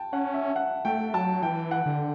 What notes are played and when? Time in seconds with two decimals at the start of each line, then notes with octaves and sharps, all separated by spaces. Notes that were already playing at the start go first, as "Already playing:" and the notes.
Already playing: G5 A5
0.13 C#4 F#5
0.34 E5
0.56 F#5
0.85 A3 G5
1.14 F#3 A5
1.42 E3 G5
1.71 F#5
1.86 D3